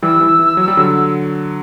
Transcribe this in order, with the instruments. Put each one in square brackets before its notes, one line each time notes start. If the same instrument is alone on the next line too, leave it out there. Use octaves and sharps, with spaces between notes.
[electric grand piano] E3 G3 [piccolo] E6
[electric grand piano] E3
E3
F#3
G3
D3 F#3